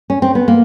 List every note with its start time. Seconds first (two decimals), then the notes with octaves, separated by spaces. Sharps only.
0.10 C#4
0.22 C4
0.35 B3
0.48 A#3